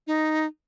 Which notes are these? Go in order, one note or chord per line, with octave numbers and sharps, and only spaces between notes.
D#4